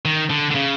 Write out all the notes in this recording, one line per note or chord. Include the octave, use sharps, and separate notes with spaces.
D#3
D3
D3
C#3